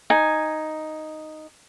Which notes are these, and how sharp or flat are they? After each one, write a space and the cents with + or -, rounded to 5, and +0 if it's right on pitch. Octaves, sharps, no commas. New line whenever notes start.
D#4 +0 G#5 +0